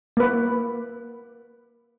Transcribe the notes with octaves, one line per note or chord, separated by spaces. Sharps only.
A#3 B4